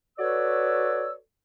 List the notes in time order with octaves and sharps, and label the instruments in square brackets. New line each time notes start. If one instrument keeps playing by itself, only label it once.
[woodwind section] F#4 A4 B4 C#5 D5 E6